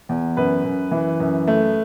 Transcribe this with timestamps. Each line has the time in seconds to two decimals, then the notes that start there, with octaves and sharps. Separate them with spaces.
0.09 E2
0.37 F#2 B4
0.65 F#2
0.91 E3
1.20 F#2
1.48 A3